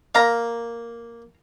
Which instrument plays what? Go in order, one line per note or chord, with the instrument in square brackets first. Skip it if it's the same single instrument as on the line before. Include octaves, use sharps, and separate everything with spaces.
[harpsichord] A#3 [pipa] F5 A#5